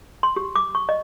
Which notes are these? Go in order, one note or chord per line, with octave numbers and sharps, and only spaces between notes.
C6
G4
D6
C#6
D#5